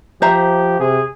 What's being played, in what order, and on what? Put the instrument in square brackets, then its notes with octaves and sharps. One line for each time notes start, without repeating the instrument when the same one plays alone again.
[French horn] F3 [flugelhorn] G4 [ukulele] C5 E5 A#5
[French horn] C3 [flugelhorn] G#4